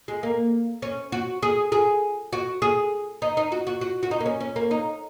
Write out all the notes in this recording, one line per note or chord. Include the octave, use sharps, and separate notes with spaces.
G#3
A#3
C#4
F#4
G#4
G#4
F#4
G#4
D#4
D#4
F#4
F#4
F#4
F#4
D#4
A#3
C#4
C#4
A#3
D#4